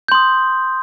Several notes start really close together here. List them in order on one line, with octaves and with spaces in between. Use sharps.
G6 C6 D#6